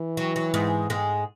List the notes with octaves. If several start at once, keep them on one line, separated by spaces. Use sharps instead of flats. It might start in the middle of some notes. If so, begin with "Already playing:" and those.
Already playing: E3
F#3
F#3
G#2 G#3
G#2 G#3